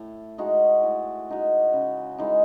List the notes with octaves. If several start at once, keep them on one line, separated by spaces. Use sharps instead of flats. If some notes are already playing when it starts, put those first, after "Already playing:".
Already playing: A2
G#3 D#4 F#4
A2
G#3 D#4 F#4
C#3
E3 G#3 D#4